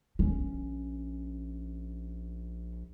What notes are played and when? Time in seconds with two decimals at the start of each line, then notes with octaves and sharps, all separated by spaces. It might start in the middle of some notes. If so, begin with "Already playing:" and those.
0.19 A#1 C#4